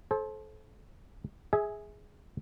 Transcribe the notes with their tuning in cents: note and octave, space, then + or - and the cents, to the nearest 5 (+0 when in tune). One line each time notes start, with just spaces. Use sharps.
A4 -30 C5 +25
G#4 +0 E5 -25 G#5 +20